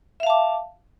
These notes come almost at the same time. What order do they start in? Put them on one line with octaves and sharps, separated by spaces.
E5 F5 A5 D6